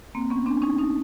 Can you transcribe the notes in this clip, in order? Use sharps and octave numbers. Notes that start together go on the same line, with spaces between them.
A#3 C4
B3 C#4
C4 D4
C#4 D#4
C#4 D#4